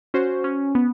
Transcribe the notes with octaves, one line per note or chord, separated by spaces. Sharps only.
C#4 F#4 C5
C#4
B3